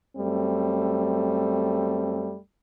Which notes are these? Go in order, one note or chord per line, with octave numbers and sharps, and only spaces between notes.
F#2 G3 A3 C4